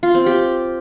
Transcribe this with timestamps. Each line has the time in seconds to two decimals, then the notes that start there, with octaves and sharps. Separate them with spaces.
0.03 F4
0.15 C4
0.26 G4